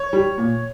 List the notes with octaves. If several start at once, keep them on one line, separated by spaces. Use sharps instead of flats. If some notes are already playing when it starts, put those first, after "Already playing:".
Already playing: C#5
G3
A#2